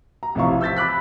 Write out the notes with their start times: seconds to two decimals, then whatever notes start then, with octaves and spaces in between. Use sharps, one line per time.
0.23 A#5
0.35 A1 C3 F3 E4 F5 C#6
0.61 E6 G6 A6 B6
0.76 B5 D6 F#6 B6